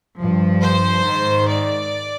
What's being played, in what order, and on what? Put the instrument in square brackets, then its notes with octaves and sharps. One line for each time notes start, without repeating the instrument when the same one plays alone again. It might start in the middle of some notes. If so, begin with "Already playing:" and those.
[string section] G2 F3
C5
G#2 D#3
D5